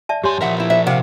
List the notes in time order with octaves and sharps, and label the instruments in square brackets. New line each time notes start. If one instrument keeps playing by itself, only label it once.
[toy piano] D5 E5 A5
[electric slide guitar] F#2 G#5 [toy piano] G4 C#5 C6
[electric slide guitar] A#2 F3 A#4 [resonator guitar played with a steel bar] E3 E5 F#5
[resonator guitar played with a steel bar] B3 E4
[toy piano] C5 [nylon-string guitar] E5
[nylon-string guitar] C3 [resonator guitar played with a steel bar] F5 F#5